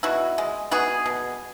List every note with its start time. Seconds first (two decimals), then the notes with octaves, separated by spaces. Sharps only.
0.03 B2 E4 F#4
0.38 G#3
0.71 B3 F#4 G#4
1.06 B2